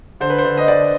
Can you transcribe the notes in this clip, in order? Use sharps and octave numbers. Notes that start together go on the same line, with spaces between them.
D3 C5
B4
C5
D3
D#5
D3 D5